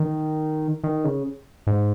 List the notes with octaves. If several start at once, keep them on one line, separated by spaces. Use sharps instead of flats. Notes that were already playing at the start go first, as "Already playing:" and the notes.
Already playing: D#3
D#3
C#3
G#2